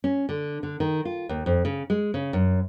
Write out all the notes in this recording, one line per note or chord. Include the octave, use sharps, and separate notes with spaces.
C#4
D3
D3
D#3
F4
D#2
F2
C#3
G#3
C#3
F#2